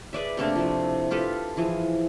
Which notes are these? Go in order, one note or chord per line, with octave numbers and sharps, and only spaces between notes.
G#4 B4 D5 E5
C3 A3 A#3 D4
F3 A3 E4
F4 G4 A4 B4
E3 F3 G#4